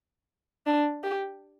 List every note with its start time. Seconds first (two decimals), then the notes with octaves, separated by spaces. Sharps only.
0.66 D4
1.03 G4